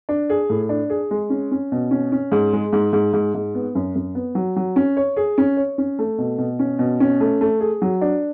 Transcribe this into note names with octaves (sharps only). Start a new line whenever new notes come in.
D4
G#4
A2
D4
G#4
G#3
C#4
C#4
B2
C#4
C#4
G#2
G#3
G#2
G#2
G#2
G#2
B3
F#2
F#2
B3
F#3
F#3
C#4
C#5
G#4
C#4
C#5
C#4
A3
B2
B2
C#4
B2
C#4
A3
A3
G#4
F#3
D4